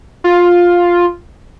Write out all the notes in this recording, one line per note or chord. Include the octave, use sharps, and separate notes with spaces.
F4